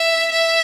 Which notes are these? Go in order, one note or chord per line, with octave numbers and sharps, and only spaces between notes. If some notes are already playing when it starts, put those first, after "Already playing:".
Already playing: E5
E5